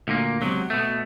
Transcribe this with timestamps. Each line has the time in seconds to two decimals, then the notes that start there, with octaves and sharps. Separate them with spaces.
0.08 D2 A#2 A#3
0.42 C#2 C3 F#3 B3
0.70 B2 A3